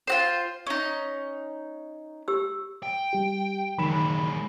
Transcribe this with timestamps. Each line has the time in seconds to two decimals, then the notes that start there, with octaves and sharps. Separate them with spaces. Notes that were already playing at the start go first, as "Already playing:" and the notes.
0.07 F4 F#4 C5
0.67 C#4 D#4
2.28 G4 E6
2.83 G5
3.13 G3 G4
3.78 D#3 F#3 G#3 B5 E7